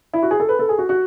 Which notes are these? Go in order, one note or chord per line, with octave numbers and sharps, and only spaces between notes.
E4
F#4
G#4
A4
B4
A4
G#4
F#4
F#4